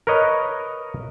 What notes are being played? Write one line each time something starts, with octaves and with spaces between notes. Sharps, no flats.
A#4 B4 C#5 D#5